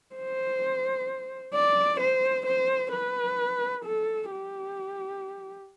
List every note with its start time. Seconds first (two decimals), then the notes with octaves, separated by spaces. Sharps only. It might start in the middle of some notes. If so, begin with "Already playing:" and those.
0.15 C5
1.54 D5
2.00 C5
2.46 C5
2.92 B4
3.85 A4
4.31 G4